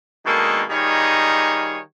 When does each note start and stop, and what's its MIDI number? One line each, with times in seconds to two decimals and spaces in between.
0.26 0.63 47
0.26 0.63 51
0.26 0.63 56
0.26 0.63 58
0.26 0.63 62
0.26 0.63 69
0.70 1.79 51
0.70 1.79 55
0.70 1.79 63
0.70 1.79 65
0.70 1.79 68
0.70 1.79 73